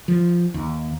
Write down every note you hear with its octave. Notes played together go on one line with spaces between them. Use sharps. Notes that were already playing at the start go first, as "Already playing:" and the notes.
F3
D#2